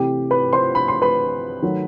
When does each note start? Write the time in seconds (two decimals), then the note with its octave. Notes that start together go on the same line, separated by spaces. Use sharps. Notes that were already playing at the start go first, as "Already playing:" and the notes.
Already playing: C3 E3 A3 G4 G5
0.31 B4 B5
0.53 C5 C6
0.75 B5
0.88 C6
1.02 B4 B5
1.62 D#3 F#3 A3